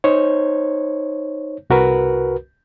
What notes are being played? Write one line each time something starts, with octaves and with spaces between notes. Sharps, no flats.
D#4 C5 C#5
C2 F#4 A#4 B4